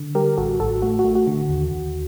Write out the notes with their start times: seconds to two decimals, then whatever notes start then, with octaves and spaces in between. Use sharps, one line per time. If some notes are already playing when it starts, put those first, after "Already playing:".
Already playing: D3
0.15 G3 G4 A#4
0.38 A1 F#4 A4
0.60 A1 F#4 A4
0.82 A3 F#4
0.99 F#4
1.04 A3
1.15 F#4
1.27 D3
1.49 D#2
1.71 D#2